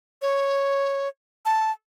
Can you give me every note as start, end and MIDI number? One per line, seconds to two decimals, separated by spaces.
0.22 1.08 73
1.45 1.71 81